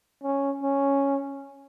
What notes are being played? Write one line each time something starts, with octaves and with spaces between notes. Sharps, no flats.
C#4
C#4